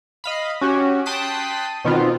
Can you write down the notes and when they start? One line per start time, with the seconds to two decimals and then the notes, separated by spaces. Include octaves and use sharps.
0.24 D#5 F5 B5
0.61 C#4 F#4 G4
1.06 G5 A5 C6 D#6 F#6 B6
1.85 B2 D#3 B3 C4 F4